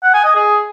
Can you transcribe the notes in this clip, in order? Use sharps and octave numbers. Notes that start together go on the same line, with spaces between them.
F#5
G#5
D#5
G#4